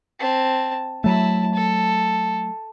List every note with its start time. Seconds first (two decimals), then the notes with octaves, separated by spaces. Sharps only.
0.19 C4 A5
1.04 F#3 A3 E4 A5
1.54 A4